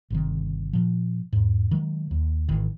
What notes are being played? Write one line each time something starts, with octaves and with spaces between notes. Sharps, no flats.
G1 C3 D#3
A#2 F3
E2 G#2
D#3 F#3 G#3
D#2
G#1 D#3 E3